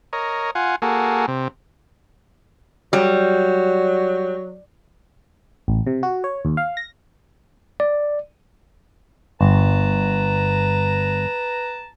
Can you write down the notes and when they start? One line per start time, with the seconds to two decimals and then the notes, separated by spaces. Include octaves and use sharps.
0.13 A#4 C#5 D#5
0.55 F4 F#5 G#5
0.82 A#3 F#4 G#4 A4
1.28 C3
2.93 F#3 G3
5.68 A1
5.87 C3
6.03 F#4
6.24 C#5
6.45 D#2
6.57 F5
6.77 A#6
7.80 D5
9.41 G1 B4 A5 A#5